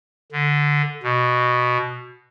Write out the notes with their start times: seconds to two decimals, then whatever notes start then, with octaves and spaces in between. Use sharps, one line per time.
0.32 D3
1.03 B2